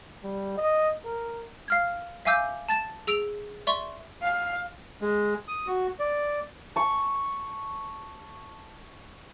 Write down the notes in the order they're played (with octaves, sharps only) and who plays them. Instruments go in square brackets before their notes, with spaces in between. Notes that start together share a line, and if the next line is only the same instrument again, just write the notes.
[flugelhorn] G3
D#5
A#4
[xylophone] F5 F6 G#6
E5 F5 G#5 D6 E6 G6
A5 A6 E7
G#4 E6 D7 F7
D5 E5 C6 C#6
[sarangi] F5
[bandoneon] G#3
D#6
F#4
D5
[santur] A5 C#6